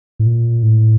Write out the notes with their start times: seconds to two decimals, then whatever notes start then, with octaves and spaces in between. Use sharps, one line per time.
0.19 A2
0.26 A#2
0.63 A2